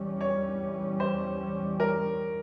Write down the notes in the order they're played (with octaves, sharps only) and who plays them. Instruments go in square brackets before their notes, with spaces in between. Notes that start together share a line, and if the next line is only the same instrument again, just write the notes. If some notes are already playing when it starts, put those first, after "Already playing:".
Already playing: [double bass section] E2 E3 G3 C#4
[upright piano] C#5
C5
A#4